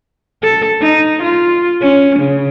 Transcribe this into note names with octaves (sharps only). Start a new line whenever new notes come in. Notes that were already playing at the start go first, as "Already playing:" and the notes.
A4
D#4
F4
C#4
C#3